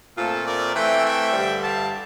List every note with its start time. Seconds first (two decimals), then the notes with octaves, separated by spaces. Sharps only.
0.17 A#2 A3 C4 F4 A4
0.46 A#4 D5
0.75 E3 A3 C4 E5 G5
1.04 E5 G5
1.33 G2 D3 G3
1.62 F5 A5